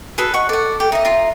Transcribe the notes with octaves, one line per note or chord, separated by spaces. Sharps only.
F#4 G#4 A4 B4
D#5 F#5 C#6
A4 D5 F#5
G4
D#4 D#5 E5
F4 A#5